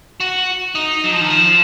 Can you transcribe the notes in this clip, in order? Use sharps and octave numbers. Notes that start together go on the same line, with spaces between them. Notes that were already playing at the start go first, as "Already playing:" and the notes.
F#4
D#4
F#3
F3
D#3
F3